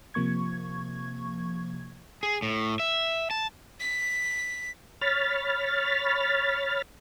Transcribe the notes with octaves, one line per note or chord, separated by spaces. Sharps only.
C3 F3 A#3 C#6 G#6
G#4
A2
E5
A5
B6
C#5 B5 F6 A6